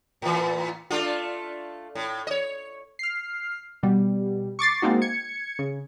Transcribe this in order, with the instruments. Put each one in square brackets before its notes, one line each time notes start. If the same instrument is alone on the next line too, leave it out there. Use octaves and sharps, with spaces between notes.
[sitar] A2 E3
A3 D4 F4
A2
C#5 D#5
[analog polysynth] F6 C7
B2 G3
C#6 D6 A6 C7
G#3 A#3 C4 D#4 F#4
G#6 C#7
C#3